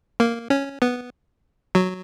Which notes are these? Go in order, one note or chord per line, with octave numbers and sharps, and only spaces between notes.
A#3
C#4
B3
F#3